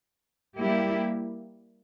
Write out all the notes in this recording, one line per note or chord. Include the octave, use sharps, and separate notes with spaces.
G3 A#3 E4 G4